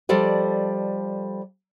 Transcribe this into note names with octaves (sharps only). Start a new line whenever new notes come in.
F3 G3 A4 D5 D#5